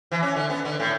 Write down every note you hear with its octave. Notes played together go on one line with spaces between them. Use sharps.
E3
C#4
D3
B3
D3
A2